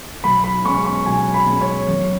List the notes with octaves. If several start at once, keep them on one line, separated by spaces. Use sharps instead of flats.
B1 B5
B5
B2 G#3 C#4 C#6
C#6
B1 G#5
B5
B2 G#3 C#4
C#5
F#2